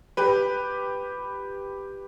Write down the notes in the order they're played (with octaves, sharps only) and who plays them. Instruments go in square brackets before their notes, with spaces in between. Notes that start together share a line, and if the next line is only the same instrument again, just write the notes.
[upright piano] G4 B4